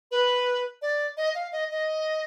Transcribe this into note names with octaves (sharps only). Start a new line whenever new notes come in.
B4
D5
D#5
F5
D#5
D#5